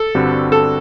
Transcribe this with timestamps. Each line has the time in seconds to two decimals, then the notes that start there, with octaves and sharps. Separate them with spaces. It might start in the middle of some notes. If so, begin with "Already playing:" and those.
Already playing: A4
0.15 G2 D3 G3 C4 F#4
0.52 A4